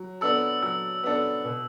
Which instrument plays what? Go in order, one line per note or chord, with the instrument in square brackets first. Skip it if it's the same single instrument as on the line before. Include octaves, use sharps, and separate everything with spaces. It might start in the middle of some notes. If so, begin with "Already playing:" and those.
Already playing: [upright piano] F#3
[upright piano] B3 D4 A4 [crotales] E6
[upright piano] F#3 [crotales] E6
[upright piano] B3 D4 A4
B2